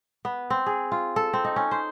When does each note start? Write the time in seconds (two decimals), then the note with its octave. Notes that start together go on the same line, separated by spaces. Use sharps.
0.25 B3
0.50 C4
0.66 G#4
0.92 F4
1.16 A4
1.33 C4
1.45 D#4
1.56 C#4
1.71 C5